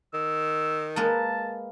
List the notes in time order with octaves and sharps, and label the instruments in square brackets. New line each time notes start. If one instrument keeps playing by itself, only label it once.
[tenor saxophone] D#3 [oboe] E6
[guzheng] G#3 A#3 B4 [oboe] A5